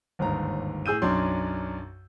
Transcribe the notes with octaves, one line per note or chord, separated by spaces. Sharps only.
G1 D#2 G#2 A#5
A2 G#4 E6 G6 D#7
B1 F#2 D4 C#5 C6